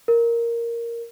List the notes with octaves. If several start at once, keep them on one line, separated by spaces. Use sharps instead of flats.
A#4